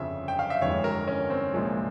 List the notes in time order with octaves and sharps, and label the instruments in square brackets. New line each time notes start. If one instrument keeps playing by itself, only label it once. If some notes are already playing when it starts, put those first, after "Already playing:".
Already playing: [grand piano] G1 F2 C#3 F3 E5
G5
F5
E5
G1 F2 E3 G#3 C#5
A#4
C#4
C4
C2 A#2 F3 G#3